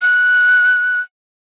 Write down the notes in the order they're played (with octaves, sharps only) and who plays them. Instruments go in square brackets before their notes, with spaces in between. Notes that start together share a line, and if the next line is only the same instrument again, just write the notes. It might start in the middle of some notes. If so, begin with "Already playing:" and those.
[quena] F#6